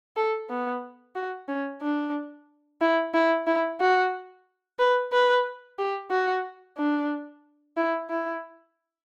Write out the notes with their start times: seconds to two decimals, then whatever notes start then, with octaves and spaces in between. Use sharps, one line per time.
0.17 A4
0.50 B3
1.16 F#4
1.49 C#4
1.82 D4
2.81 E4
3.14 E4
3.47 E4
3.80 F#4
4.79 B4
5.13 B4
5.79 G4
6.11 F#4
6.78 D4
7.77 E4
8.10 E4